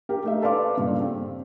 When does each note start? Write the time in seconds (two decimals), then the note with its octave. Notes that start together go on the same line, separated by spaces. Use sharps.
0.09 G4 A#4
0.24 A3 D#4 E5
0.42 A4 B4 D5 F5 C6 D6
0.77 G2 A#2 C#3
1.01 C4